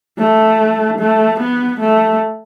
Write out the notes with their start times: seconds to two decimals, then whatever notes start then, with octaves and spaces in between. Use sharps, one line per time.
0.18 A3
0.98 A3
1.39 B3
1.80 A3